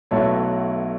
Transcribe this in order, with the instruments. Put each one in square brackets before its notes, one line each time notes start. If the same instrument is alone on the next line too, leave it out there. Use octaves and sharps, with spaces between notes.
[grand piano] B1 B2 F#3 A3 E4 A4 C#5